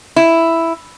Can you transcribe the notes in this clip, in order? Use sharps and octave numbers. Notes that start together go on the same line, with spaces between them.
E4